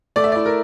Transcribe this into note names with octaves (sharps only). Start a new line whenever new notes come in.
A3 D5
E5
E4 D5
A#4